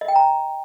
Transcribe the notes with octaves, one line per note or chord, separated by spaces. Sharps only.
D#5
G5
A#5